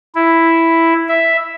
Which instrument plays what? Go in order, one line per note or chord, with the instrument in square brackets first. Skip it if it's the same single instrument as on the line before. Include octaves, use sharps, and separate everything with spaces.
[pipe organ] E4
E5